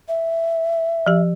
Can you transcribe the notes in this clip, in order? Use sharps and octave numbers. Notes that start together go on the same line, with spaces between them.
E5
F3 G4